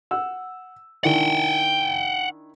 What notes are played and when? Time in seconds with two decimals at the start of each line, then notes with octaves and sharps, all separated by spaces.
0.11 F#5 E6
1.04 D#3 D4 E4 F#5 G5